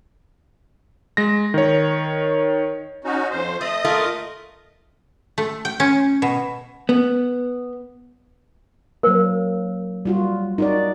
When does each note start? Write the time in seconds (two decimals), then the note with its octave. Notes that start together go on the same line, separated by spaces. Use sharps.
1.17 G#3 A#6
1.54 D#3 C#5
3.04 C#4 D#4 F#4
3.31 F2 C5
3.61 A3 D#5 D#6
3.85 A3 A#3 F4
5.38 A3
5.65 G5
5.80 C#4
6.22 B2
6.89 B3
9.03 F#3 A#3 A#4 C5
10.05 G3 F4 F#4
10.58 D#4 F#4 D5